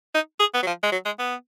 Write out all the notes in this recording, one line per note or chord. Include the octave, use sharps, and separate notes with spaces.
D#4
G#4
B3
F#3
F3
G#3
F#3
G#3
B3